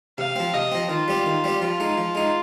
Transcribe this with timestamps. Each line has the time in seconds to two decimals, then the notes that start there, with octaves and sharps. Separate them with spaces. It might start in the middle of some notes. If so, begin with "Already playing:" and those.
0.18 C3 F5
0.36 F3 C4
0.54 C3 D#5
0.72 F3 C4
0.89 D#3 F4
1.08 G3 C4 G4
1.26 D#3
1.44 G3 C4 G4
1.61 F3 F4
1.80 G#3 D#4
1.98 F3
2.15 G#3 D#4